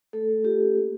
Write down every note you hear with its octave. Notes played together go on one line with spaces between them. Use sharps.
A3 A4
A3
F4 G4
C#4
A#3